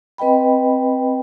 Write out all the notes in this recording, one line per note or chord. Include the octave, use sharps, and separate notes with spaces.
C4 B4 D#5 G5 B5